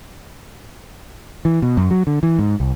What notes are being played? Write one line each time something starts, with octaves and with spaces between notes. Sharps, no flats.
E3
B2
F#2
F#3
D3
E3
G#2
C2